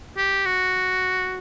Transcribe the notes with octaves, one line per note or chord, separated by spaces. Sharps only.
G4
F#4